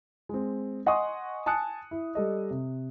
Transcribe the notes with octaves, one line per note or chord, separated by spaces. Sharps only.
G#3 C4
D#5 F#5 G#5 C6 C#6 D#6
G#5 A5 D#6 F#6 C#7
E4
G3 A4 D#5
C3